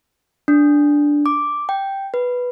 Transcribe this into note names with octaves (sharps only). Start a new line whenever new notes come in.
D4
D6
G5
B4